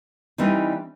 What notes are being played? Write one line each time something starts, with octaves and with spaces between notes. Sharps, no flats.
E3 G3 C4 D#4